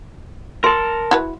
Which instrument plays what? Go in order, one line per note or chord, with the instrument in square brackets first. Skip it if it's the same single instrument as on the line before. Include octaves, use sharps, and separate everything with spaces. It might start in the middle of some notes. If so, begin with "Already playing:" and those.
[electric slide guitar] A#4 A5 [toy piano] C6
[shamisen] E4 F#4 B4